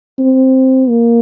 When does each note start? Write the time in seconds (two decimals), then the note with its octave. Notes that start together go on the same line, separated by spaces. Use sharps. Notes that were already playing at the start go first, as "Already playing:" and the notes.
0.18 C4
0.90 A#3